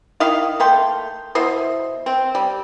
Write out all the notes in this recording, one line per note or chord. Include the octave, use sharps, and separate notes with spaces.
D#3 E4 D#5 F5
A3 A#3 G5 C6
B2 E4 C5 D#5
C4
G3